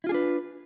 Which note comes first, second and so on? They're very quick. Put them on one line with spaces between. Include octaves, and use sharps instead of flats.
E4 F4 G#4 D4 B4